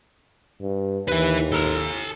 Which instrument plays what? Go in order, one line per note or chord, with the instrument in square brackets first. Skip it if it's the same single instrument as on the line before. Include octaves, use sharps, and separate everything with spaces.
[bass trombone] G2
[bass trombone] D#2 [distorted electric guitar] E4 B4
[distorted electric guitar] A4 A#5